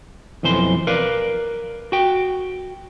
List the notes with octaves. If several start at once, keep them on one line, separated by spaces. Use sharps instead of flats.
B1 F2 E3 C5 C6
A#4 B4 D5 F5
F#4 G5